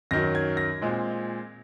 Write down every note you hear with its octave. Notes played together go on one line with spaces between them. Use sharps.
F#2 D#3 F#3 A#6
G#6
A#6
A#2 G#3 C4